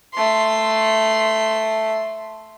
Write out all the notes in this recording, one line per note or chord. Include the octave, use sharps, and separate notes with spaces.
A3 C6